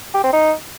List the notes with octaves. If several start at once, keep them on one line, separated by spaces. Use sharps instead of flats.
G4
C4
D#4